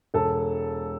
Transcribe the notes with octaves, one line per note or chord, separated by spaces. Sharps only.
E1 A4